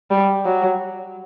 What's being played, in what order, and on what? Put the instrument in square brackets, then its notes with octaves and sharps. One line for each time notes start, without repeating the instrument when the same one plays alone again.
[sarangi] G3
F#3